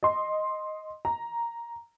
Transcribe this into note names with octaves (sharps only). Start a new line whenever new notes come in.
D#5 C6
A#5